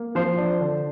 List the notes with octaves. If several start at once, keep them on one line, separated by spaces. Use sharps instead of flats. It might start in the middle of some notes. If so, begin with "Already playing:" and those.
Already playing: A#3
F3 C5
D4
D3